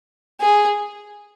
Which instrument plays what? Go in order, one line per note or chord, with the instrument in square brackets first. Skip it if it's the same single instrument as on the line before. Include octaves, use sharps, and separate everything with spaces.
[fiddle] G#4